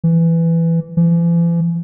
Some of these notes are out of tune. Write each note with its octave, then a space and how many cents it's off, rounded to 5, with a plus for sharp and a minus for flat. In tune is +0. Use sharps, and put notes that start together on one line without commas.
E3 +10
E3 +45